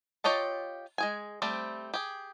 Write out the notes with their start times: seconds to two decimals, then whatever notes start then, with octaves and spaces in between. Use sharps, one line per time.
0.24 F4 G4 C#5 D#5 A5
0.98 G#3 G#4 G#5
1.42 G3 A3 C4 D5
1.94 G4 G#4